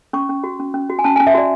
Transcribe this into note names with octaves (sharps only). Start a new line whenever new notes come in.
C#4 C#6
C#4
F#4
C#4
C#4
F#4
G#5
C#4 A5
G#5
C#4
E5
F#4 D5